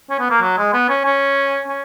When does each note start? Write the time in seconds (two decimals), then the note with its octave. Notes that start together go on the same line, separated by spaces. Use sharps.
0.10 C#4
0.20 B3
0.31 A#3
0.42 F#3
0.58 G#3
0.73 B3
0.89 C#4
1.05 C#4
1.68 C#4